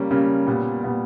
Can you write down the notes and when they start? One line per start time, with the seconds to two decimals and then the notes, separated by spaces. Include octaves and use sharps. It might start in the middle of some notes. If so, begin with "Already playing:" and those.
Already playing: C#3 G3 A#3 C#4
0.11 C#3 G3 A#3 C#4
0.47 A#2 G3 B3
0.84 A#2 G3 B3